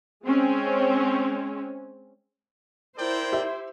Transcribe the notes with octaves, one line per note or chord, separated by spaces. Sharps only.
G#3 C4 C#4
E4 A#4 C5 D5 G5
G4 E5